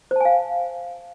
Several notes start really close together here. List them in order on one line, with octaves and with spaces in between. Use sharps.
C5 A5 G#5 F5